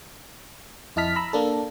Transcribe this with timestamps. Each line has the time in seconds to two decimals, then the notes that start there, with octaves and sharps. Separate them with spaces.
0.96 F2 E4 D#5 A5 F6 B6
1.16 A#5 B5 E6
1.33 A#3 D4 A4